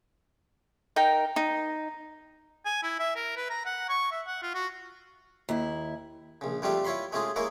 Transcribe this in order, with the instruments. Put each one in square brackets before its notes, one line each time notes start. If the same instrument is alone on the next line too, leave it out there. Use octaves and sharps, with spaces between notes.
[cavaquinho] D#4 A#4 G5
D#4
[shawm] G#5
E4
E5
A#4
B4
A#5
F#5
C#6
E5
F#5
F4
F#4
[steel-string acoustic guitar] D#2 E4
[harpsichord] A#1 C#3
F2 G3 A3 F4 G4 F5
E4 F4 C#5 B5 C6
G#3 A3 C#4 F4 G#4
G#3 A#3 E4 A#4 C#5 F5